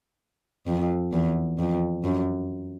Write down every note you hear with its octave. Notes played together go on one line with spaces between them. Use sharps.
F2
E2
F2
F#2